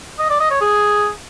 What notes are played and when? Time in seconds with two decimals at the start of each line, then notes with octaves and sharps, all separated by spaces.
0.19 D#5
0.30 D5
0.40 D#5
0.51 C#5
0.61 G#4